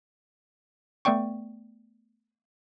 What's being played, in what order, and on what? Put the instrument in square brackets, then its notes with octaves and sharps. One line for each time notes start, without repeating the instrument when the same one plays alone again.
[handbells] A3 B3 D5 G5 C#6